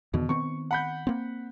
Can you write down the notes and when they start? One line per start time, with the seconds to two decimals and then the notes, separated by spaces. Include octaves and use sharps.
0.14 E2 B2 D3 D#3
0.29 D#3 B3 C4 C#6
0.71 F#5 B5 G6
1.07 A#3 C4